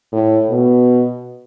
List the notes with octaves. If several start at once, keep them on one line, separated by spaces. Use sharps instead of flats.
A2
B2